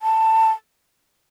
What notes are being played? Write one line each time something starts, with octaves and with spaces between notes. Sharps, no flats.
A5